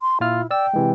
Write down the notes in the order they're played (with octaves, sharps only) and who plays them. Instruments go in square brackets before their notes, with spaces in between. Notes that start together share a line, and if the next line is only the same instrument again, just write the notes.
[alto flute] C6
[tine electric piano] A#2 F4 F6 [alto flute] E4
[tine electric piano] D5 E6 [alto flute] G5
[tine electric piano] C3 E3 G#3